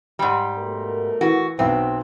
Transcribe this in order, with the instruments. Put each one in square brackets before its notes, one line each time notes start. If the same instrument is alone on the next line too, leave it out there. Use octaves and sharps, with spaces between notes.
[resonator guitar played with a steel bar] G#2 G3
[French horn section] B2 A3 A#4
[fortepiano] E3 [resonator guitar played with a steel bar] F#4
[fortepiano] B1 B3 [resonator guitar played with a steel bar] C4